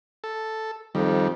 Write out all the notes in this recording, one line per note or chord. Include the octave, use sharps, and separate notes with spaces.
A4
F2 D#3 G3